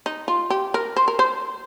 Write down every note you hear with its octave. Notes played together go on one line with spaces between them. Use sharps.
D#4
F4
G4
A#4
C5
A#4
C5